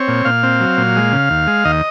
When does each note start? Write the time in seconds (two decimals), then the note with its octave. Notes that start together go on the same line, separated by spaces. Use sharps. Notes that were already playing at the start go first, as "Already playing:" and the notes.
Already playing: C4 C#5
0.08 A#2
0.25 A#2 F5
0.43 C4
0.60 F#3
0.77 A#2
0.96 G#3
1.12 C#3
1.30 D#2
1.47 G#3
1.65 D#2 D#5